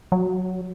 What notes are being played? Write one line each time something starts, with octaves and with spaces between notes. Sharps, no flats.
F#3